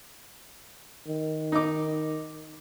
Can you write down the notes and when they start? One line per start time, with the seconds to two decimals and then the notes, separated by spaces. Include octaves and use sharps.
1.08 D#3
1.52 D#4 D6